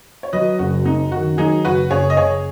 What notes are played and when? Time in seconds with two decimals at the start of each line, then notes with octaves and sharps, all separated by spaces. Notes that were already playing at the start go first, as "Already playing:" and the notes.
0.23 C#5
0.33 F#3 B4 D#5
0.59 F#1 F#4
0.85 F#2 D#4
1.12 D#3 F#4
1.38 F#3 D#4 G#4
1.64 F#1 F#4 B4
1.90 F#1 G#4 C#5
2.10 D#5
2.17 F#1 G#4 C#5